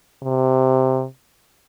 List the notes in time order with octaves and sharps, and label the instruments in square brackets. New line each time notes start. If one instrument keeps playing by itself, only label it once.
[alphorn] C3